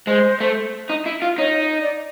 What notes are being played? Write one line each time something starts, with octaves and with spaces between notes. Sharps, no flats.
G#3 C5
A3
D#4
E4
F4
D#4 C#5
D#5
D5